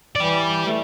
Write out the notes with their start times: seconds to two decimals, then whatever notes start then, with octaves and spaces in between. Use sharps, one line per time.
0.16 E3 G4 D5
0.66 A3